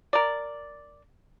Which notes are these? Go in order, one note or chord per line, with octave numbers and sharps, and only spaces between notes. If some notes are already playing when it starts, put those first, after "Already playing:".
A#4 D5